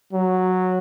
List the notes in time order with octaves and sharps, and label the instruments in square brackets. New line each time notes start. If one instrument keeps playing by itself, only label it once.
[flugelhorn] F#3